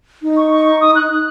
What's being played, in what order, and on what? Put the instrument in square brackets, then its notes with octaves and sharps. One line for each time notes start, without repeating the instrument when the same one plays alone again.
[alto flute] D#4
[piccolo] C#6
C#6
C#6
D#6
F#6